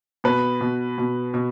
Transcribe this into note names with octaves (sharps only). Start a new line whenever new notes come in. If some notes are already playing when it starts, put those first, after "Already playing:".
B2 B4
B2
B2
B2